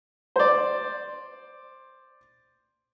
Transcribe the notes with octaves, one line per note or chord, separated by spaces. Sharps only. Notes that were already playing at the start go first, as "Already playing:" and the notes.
C5 D5